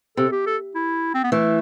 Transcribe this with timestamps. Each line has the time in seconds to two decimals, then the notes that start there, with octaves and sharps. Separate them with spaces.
0.17 C3 A4
0.32 G4
0.47 A4
0.75 E4
1.14 C4
1.24 B3
1.32 E3 A3